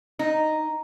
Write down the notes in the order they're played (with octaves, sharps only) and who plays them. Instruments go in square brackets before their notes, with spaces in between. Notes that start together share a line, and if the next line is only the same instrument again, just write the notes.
[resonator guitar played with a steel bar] D#4